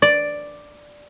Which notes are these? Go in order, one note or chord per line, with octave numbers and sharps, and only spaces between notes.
D5